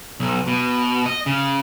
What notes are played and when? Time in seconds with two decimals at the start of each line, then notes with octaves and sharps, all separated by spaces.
0.20 B1
0.47 B2
1.06 D#5
1.26 C#3